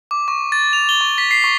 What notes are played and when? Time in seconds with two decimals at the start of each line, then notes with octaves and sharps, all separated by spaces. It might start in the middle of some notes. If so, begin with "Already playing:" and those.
0.11 D6
0.28 C#6
0.52 A6
0.73 F7
0.89 G7
1.01 C#6
1.18 B6
1.31 C7
1.44 C#6